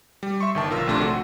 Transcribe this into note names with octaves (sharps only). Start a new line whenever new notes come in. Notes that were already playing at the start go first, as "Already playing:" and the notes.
G3
E5 C6 C#6
G1 D#3 A5
A#1 F4 A#4 E6
A#1 D#2 C3 A3 D4 C6
F#4 C6